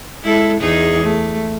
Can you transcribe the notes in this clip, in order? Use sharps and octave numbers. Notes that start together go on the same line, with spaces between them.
G#3 E4 A4
E2 D#4 G#4
A3